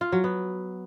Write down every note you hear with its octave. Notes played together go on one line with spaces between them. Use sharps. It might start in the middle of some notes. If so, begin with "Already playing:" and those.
F4
F#3
B3